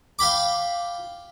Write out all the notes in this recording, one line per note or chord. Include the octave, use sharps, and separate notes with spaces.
F5 G5 B5 D6